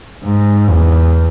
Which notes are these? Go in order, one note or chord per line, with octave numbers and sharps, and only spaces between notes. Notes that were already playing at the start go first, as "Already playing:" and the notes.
G#2
E2